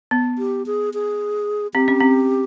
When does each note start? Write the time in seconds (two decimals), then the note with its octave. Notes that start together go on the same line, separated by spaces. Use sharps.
0.11 B3
0.38 G4
0.66 G#4
0.94 G#4
1.74 C4 G4
1.88 C#4
2.00 C4